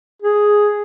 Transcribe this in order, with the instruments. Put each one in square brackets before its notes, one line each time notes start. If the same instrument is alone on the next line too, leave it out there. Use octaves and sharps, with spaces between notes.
[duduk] G#4